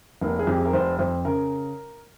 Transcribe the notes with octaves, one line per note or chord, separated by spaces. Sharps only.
F1 A#3
G#4
F2 G4
G#4
A#4
F1 C5
F2 C5
C#3 A#4